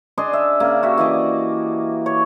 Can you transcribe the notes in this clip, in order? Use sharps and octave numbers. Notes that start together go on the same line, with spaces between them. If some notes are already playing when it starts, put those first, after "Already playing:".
D4 G#4 D#5 C6
E5
C#3 A#3
F#4 G4 E5
E3 D5 D#5
C#5